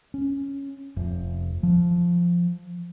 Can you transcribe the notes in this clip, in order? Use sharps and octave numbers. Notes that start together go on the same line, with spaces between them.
C#4
F1
F3